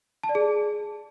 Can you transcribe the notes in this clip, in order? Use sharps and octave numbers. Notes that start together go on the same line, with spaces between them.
A5
D5
G#4